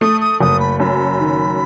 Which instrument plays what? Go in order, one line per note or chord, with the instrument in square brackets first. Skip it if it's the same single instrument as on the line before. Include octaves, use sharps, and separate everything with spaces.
[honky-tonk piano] A3 [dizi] D#6
[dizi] D#6
[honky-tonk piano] F#1 [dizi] D#6
[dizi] B5
[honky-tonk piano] F#2 [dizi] B5
[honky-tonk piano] D#3